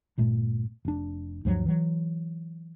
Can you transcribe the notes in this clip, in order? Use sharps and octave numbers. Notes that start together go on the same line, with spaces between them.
G1 A#2 A3
F1 D4
D2 G2 F3 F#3
E3 F#3